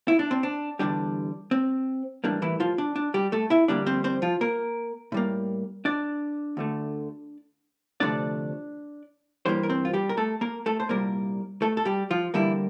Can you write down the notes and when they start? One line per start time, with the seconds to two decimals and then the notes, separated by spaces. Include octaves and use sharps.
0.08 E4
0.19 D4
0.31 C4
0.43 D4
0.79 E2 D3 G3 D4
1.51 C4
2.24 A2 E3 G3 A#3 D4
2.42 E3 E4
2.60 F3 F4
2.78 D4
2.96 D4
3.14 G3 G4
3.32 A3 A4
3.50 E4 E5
3.68 F2 D3 G3 A#3 D4 D5
3.86 C4 C5
4.04 C4 C5
4.22 F3 F4
4.41 A#3 A#4
5.12 A2 G3 A#3
5.85 D4 D5
6.57 D2 D3 A3
8.00 D2 C3 F3 A3 D4 D5
9.46 G2 E3 G3 A#3 C4 C5
9.63 A#4
9.70 C4 C5
9.85 F4
9.93 G3 G4
10.09 A#4
10.17 A3 A4
10.41 A#3 A#4
10.66 A3 A4
10.80 C5
10.89 C2 A#2 G3 A#3 A#4
11.62 A3 A4
11.77 A4
11.85 G3 G4
12.11 F3 F4
12.34 D2 D3 E3 G3 A#3 E4